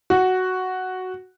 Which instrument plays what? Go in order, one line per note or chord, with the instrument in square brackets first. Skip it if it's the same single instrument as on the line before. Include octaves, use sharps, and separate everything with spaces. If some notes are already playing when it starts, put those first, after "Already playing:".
[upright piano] F#4